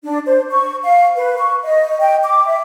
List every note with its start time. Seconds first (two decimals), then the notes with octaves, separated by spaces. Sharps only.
0.04 D4
0.27 C5
0.50 C#6
0.83 F5
1.17 B4
1.37 C#6
1.64 D#5
2.01 G5
2.24 D6
2.47 E5